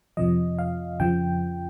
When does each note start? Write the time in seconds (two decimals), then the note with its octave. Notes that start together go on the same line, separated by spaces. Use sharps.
0.17 F2 C3 F3 D#5
0.59 F5
1.00 F2 C#3 F3 G5